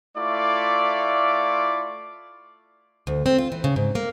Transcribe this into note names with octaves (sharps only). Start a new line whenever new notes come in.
A3 E4 F4 D5 C#6 D6
D2
C4
F4
E3
C#3
G#2
A#3